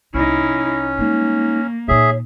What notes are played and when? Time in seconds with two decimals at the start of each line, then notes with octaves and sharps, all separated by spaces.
0.14 C2 C#4 D#4 E4
0.99 G3 G#3 A#3 D#4
1.88 A#2 D#4 G#4 C#5 E5